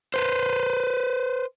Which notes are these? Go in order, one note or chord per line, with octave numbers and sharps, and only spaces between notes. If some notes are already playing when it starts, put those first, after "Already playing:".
B4 C5